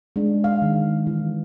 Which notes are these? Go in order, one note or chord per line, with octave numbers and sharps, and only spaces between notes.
G#3 D4
F5
D#3
E3